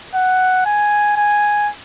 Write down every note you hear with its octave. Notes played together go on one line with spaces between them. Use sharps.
F#5
G#5
G#5